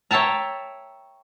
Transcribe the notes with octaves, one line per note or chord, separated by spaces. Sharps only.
C#5 E5 G5 A5 A#5